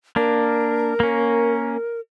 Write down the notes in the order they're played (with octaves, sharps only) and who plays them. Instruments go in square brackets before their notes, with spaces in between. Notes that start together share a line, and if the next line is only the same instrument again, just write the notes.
[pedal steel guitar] A#3 D4 [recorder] A#4
[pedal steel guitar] A#3 C#4